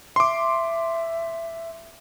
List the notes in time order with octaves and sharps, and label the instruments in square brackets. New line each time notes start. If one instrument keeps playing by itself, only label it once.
[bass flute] E5 [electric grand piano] C6 D6